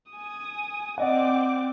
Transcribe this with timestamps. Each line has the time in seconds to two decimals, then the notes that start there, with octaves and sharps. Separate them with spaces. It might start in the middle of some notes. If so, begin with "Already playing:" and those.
0.12 G#5 D#6
0.98 C4 D5 D#5 F#5 D6